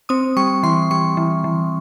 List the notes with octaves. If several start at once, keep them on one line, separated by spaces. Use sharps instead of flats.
C4 D#6
G3 C#6
E3 C6
G3 C#6
E3
E3